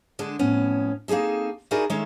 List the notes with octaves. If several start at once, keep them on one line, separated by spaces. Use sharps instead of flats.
D3 G#3 D4
F2 A2 B3 C#4
A#3 C4 D#4 G#4 A4
D#4 E4 F#4 G#4 A#4 D5
D#3 G#3 A3 C#4 E5